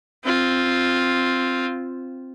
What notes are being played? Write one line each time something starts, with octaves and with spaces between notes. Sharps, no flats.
C4 F4